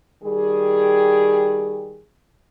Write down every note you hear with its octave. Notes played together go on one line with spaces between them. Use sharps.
D#3 G3 G#4